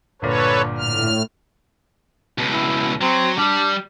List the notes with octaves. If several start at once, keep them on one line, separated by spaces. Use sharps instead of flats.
G1 A#2 A4 B4 C#5
A2 F6
C#2 B2
E4
F#3 C4
G3 D4